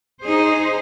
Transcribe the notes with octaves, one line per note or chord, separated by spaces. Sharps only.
D#4 G#4 C5